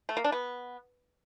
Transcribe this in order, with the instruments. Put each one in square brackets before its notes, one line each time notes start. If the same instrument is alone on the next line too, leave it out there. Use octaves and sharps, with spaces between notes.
[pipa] A3
A#3
D4
B3